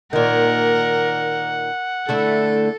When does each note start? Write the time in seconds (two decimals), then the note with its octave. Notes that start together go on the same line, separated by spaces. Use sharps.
0.13 A#2 D#3 A#4 F#5
2.09 D3 A3 E4 A4